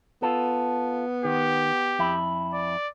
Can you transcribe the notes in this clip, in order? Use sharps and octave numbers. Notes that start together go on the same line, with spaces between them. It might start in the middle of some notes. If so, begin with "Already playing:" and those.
B3 F4 A4
D#3 G4
F2 E4
D5